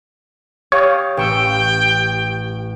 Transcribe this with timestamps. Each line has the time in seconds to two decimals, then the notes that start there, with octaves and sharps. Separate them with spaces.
0.72 G4 C#5 F5 D#6
1.17 A1 G5 C#6 E6